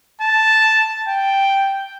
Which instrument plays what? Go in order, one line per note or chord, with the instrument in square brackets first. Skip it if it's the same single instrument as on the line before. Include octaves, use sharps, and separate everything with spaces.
[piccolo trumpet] A5
G5